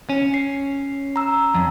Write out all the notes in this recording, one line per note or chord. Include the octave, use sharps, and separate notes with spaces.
C#4
C7
A#5 E6
F2